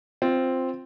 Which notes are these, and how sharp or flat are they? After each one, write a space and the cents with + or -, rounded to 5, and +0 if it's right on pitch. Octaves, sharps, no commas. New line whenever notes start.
C4 +0 F4 +0